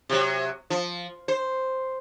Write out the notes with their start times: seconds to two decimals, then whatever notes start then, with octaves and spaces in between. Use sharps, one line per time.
0.10 C3 F#3
0.70 F3
1.28 C5